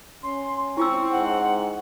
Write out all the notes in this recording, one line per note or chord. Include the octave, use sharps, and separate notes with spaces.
C#4 C6
C4 E4 F4 C#6 E6
G#2 F#5